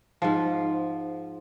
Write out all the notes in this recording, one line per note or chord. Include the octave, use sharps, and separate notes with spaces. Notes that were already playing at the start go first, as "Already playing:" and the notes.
G#2 F3